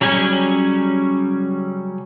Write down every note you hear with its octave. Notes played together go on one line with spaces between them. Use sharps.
C#3 F#3 G3 C#4 G#5